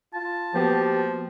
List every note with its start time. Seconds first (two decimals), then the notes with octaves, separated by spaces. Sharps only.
0.14 F4 A5
0.54 F3 A#3 B3 F#4 G4